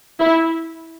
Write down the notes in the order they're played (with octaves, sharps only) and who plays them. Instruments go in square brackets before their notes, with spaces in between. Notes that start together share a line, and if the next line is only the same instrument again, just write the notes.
[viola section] E4